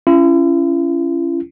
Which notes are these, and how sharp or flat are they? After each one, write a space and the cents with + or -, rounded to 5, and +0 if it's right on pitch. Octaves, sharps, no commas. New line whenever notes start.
C#4 +0 E4 +45